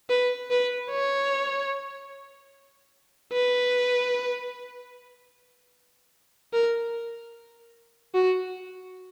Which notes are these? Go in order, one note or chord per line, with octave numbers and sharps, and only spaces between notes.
B4
B4
C#5
B4
A#4
F#4